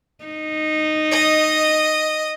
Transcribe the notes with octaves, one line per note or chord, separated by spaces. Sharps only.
D#4
D#5